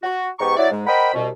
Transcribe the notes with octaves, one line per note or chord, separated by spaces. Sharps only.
F#4
G#2 B3 G4 A#5 C#6
F#3 E4 D5
G#2 G#3
A#4 C5 D#5 F#5 G5 B5
C2 B2